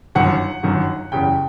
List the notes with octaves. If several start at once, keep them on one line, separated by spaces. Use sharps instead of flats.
G1 F#2 D#3 F#5
G1 F#2 D#3
F#1 E2 C#3 G5